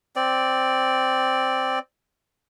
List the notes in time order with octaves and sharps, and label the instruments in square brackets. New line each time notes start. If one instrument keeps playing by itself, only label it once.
[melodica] C4 D5